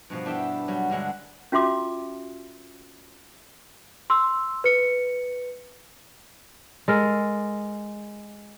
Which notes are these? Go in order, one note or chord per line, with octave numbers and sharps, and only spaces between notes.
G2 B2 F3
B3 D4 E4 G4 E5 G5
F#3 G3
G2 D3 G#3 F#5
C#4 F4 F#4 E5 C6 D6
C6 E6
B4 C#7
G#3 A4 A#4